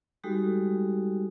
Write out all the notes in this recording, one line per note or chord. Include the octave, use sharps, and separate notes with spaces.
G3 G#3 D#4 F#4 G4 A4